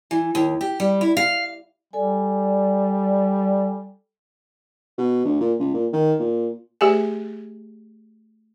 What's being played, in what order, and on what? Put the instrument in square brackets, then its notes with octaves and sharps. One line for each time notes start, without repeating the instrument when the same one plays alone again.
[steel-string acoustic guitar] E3
D#2
G4
G3
E4
F5
[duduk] G3 [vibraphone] A4 D5 G#5
[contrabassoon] B2
D2
A#2
C#2
A#2
D#3
A#2
[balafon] A3 G4 G#4 G#5